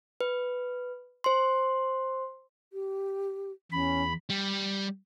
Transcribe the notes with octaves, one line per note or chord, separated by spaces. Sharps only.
B4
C5 C6
G4
E2 C#4 B5
G3